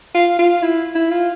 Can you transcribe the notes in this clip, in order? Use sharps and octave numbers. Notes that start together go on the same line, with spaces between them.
F4
F4
E4
E4
F4